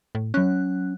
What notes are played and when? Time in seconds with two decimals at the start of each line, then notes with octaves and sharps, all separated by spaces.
0.15 A2
0.34 F#3 C#4 F#6